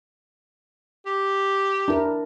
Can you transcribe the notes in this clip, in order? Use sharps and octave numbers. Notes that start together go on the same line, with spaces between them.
G4
D4 E4 A#4